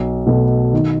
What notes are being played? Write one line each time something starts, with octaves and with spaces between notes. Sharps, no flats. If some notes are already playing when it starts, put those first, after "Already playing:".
Already playing: B1
B2 A3
D#3